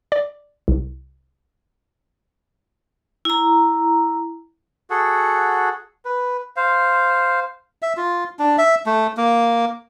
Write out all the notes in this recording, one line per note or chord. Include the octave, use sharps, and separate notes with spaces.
D5
C2
E4 A#5
F#4 G#4 A4 F#5
B4
C5 F5
E5
F4
D4
E5
A3
A#3